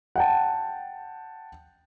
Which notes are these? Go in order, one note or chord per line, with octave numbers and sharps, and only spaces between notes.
F#5 G5 A5